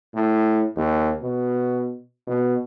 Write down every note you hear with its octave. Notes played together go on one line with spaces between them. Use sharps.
A2
D#2
B2
B2